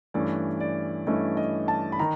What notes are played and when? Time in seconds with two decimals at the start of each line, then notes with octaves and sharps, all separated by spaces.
0.14 G2 E3 A3 C#4 D5
0.60 D5
1.07 G2 E3 A3 C#4 D#5
1.37 D#5
1.68 A5
1.92 B5
1.99 D#3 A#5